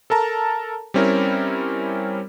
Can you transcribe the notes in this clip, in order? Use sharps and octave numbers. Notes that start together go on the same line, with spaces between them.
A4 A#4 A5 A#5
G3 C4 C#4 E4 A#4